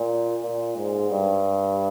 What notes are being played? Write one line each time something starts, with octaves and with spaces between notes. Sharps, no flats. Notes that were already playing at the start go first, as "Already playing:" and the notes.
Already playing: A#2
A#2
G#2
G2